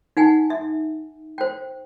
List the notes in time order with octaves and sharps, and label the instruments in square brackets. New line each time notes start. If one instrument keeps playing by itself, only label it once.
[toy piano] D#4 F#5 G#5
E5
C5 G5